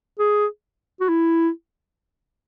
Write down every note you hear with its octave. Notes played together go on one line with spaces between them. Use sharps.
G#4
F#4
E4